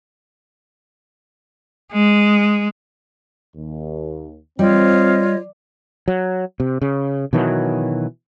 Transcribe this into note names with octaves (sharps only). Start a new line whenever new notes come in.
G#3
D#2
G3 C4 F4 C#5 D#5
F#3
C3
C#3
B2 D#3 E3 F#3